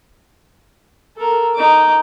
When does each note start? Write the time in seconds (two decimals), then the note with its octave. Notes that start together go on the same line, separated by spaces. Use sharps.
1.16 A4 A#4
1.55 D#4 D6